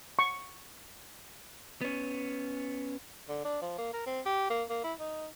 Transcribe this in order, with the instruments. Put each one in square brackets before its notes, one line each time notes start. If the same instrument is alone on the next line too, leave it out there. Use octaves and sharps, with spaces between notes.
[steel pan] C#6
[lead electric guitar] B3 C#4
[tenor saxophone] D3
D4
F3
A#3
A#4
C4
G4
A#3
A#3
E4
D#4